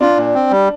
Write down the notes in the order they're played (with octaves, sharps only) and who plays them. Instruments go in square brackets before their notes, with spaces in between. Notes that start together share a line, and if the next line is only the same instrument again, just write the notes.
[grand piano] D4 [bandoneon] F4
[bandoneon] A#2
C4
G3